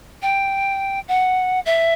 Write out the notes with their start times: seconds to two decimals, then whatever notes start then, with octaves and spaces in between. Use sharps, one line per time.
0.22 G5
1.08 F#5
1.66 E5